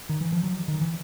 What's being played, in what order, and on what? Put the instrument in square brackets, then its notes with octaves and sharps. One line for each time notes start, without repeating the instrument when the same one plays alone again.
[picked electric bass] D#3
E3
F3
F#3
D#3
E3